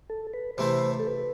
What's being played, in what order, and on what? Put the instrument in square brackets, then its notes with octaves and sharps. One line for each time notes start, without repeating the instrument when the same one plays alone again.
[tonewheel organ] A4
B4
[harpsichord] C3 E3 A3 C4 E4 [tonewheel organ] C5
[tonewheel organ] A4
B4